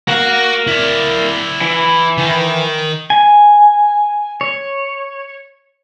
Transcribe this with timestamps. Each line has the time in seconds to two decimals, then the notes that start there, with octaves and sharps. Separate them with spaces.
0.09 F#4 A#4 F5
0.67 E4 D5
1.61 E3
2.18 D#3
3.10 G#5
4.41 C#5